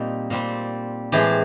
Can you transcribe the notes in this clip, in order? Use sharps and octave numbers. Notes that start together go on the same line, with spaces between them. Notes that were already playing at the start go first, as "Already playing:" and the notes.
Already playing: A#2 G3 C4 D#4
A#2 G3 C4
A2 E3 G#3 C4 G4